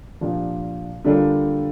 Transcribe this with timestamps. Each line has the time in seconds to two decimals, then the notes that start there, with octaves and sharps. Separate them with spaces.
0.21 A#2 F3 A#3 D4 G4
1.05 D3 G3 A#3 D4 F4